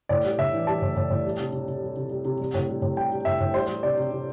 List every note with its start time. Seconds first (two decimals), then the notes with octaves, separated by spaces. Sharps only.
0.09 A2 D5
0.24 G3
0.39 A2 E5
0.53 E3
0.67 G3 A5
0.82 A2
0.96 A2
1.10 A2
1.25 G3
1.39 C3
1.53 C3
1.68 C3
1.82 G3
1.97 C3
2.11 G3
2.25 C3
2.40 G3
2.54 A2
2.69 G3
2.82 A2
2.96 G3 G5
3.11 G3
3.25 A2 E5
3.40 A2
3.54 G3 C5
3.68 G3
3.83 C3 D5
3.97 C3
4.11 C3